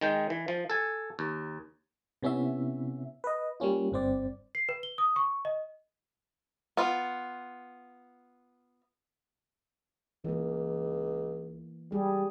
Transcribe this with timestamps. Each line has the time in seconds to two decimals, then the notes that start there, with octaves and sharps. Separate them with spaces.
0.01 D#3 G#3 G5
0.30 E3
0.48 F3
0.70 A4 G#5
1.19 D#2
2.23 C3 B3 C#4 E4 E5
3.24 B4 D#5
3.60 G3 A#3 C#4 F4
3.92 G1 G2 C4 C5 D5
4.55 C7
4.69 B4
4.83 G7
4.98 D#6
5.16 C#6
5.45 D#5
6.77 B3 F4
10.24 C#2 E3 A#3
11.92 G3 G#4